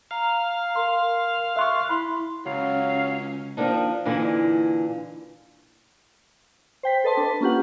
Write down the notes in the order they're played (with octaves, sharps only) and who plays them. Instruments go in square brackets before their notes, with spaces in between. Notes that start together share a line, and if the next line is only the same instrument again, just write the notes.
[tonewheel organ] F5 [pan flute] A#5
[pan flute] A#4 [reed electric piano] C6
[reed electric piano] E5 C6 C#6 [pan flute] F#6
[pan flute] E4 [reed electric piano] B5 C6
[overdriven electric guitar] C#2 [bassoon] F#3 [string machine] C#4 [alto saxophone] F5
[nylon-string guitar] D#3 F3 F#3 A#3 D4 D#4
A#2 D3 E3 D#4 E4
[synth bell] C5 G5 B6
A4 B4 D#5 A5 C6
D4 B4
A#3 C#4 F4 G4 F#5